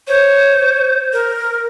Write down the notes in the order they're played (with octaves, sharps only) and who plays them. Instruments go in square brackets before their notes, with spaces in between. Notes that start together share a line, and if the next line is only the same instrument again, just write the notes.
[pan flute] C5 [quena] C#5
[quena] A#4